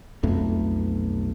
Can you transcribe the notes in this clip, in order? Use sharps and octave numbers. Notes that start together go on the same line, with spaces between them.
B1 F2 B2 A3